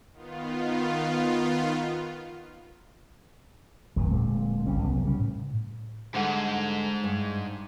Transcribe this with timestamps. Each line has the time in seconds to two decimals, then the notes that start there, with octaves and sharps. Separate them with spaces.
0.13 D#3 B3 F4
3.96 G1 D#2 A2 F#3
4.09 D1 A#2 G#3 C4
4.67 G#1 C#2 G3 C#4
4.82 C2 F#3 B3
5.03 C#3 G3 C#4
5.19 A2
6.15 G#2 D3 G3 F#5
7.04 G2